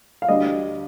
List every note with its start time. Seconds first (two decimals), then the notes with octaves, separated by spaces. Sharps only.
0.22 F5
0.28 D2 D3 G3 D#5